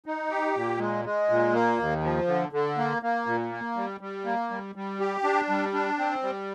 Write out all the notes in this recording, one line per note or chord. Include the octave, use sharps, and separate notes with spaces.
D#4
G4
A#2
G#3
G#3
A#2
A#3
D#2
F3
D3
D3
A#3
A#3
A#2
A#3
G3
G3
A#3
G3
G3
G4
D4
G3
D4
C4
G3